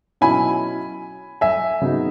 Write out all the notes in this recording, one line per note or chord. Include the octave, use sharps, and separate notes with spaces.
B2 F#3 C#4 E4 G#5 B5
E5 G#5
C#3 F#3 B3 D#4